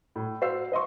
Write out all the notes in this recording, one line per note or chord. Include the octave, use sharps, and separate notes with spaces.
A2
F#4 C5 F5 E6 C7
C5 D#5 C6 C#6